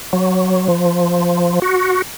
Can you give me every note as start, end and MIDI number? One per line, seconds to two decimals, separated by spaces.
0.13 0.67 54
0.68 1.59 53
1.62 2.02 66